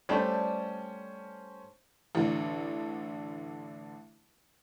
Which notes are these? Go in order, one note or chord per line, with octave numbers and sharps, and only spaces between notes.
G3 A3 C#4 D4 C5
A1 D3